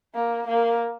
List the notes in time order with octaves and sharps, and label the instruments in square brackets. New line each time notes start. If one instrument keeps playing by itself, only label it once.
[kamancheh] A#3
A#3